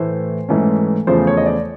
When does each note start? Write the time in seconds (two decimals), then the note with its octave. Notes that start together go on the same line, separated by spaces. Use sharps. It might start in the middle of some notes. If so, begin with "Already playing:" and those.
Already playing: A2 E3 A3 C5
0.49 G#2 E3 A3 C#4
1.07 E2 C#3 F3 A3 C5
1.27 C#5
1.37 D#5
1.46 D5